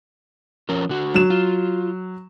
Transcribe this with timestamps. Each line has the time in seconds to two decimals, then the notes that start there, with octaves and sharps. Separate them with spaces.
0.69 F3 C#4 A#4
0.89 D3 F#4
1.14 F#3 E7
1.30 F4